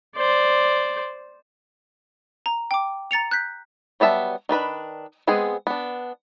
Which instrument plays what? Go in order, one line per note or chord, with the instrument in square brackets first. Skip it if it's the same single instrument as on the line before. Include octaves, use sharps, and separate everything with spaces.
[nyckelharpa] C5 D5
[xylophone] A#5
G5 D6
A#5 A6 C#7 F7
F#6 G6 B6
[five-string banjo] F#3 G3 B3 E5 A5
D#3 D4 B4 B5
G#3 B3 C4 G#4
B3 D4